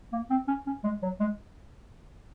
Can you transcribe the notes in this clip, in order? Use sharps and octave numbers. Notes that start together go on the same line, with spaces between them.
A#3
C4
C#4
C#4
G#3
F#3
G#3